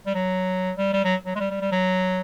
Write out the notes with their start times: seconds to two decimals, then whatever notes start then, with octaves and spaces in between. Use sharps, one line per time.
0.06 G3
0.15 F#3
0.77 G3
0.93 G3
1.04 F#3
1.26 F#3
1.36 G#3
1.40 G3
1.51 G3
1.61 G3
1.72 F#3